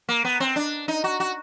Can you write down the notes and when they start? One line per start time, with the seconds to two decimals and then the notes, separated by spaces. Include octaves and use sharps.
0.09 A#3
0.24 B3
0.40 C4
0.56 D4
0.88 D#4
1.04 F#4
1.20 F#4